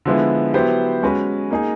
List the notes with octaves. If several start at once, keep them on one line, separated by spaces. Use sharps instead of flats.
D3 F3 G#3 B3 E4
F#3 B3 E4 G4 C5
G#3 C#4 F#4 B4
A#3 D#4 G#4